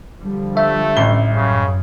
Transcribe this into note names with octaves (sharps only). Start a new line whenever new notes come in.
D3 F3 G3
A3 E5
A1 G7
F#2 C#3